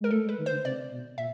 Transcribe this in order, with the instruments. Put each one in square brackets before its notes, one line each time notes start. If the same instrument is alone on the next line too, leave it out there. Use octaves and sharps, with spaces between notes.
[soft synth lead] G#3 [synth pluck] A#4
[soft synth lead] A3 [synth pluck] A4
[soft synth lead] G#3
[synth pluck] B4
[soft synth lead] D#3
[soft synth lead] D3 [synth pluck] C5
[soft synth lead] C3 [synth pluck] D5
[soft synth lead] B2
[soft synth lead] A#2 [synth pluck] E5